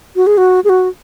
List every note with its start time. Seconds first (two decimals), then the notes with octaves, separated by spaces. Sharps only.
0.16 F#4
0.27 G#4
0.38 F#4
0.64 G#4
0.69 F#4